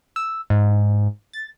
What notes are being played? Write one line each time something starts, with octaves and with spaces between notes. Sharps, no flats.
E6
G#2
A6